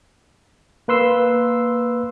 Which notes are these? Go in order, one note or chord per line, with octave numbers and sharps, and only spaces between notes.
A#3 B4 C6 E6